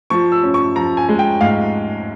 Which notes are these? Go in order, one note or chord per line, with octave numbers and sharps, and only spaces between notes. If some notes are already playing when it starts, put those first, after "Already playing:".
F3 C#6
E6
C#4
C#6
F3 A#5
G#5
G#3
G5
G#2 F5